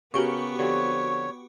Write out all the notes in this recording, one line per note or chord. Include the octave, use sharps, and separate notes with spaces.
C#3 B3 C#4 F#4 G4 A#4 C#6
D3 F3 C4 C#5